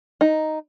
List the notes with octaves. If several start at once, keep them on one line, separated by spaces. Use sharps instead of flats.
D#4